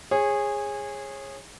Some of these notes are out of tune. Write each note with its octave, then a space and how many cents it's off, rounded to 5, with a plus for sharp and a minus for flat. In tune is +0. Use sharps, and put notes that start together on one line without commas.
G#4 -15 C#5 -25